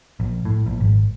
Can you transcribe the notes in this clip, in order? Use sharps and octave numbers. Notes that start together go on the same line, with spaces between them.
A#1
A2
A#1
G#1